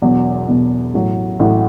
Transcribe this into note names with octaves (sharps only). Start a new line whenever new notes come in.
E1 E2 B2 F#3
E1 E2 B2 F#3
A1 A2 F#3
A1 A2 F#3